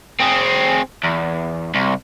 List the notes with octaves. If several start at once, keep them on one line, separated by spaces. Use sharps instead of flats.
C4 G#4
E2
C2